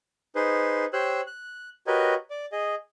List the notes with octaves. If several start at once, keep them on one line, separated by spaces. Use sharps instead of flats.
D#4 G#4 B4 C5
G4 C5 C#5 E6 F#6
F#6
F#4 G4 A#4 B4 C#5 D#5
D5
G#4 D#5